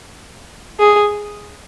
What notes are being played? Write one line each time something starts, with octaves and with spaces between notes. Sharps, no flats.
G#4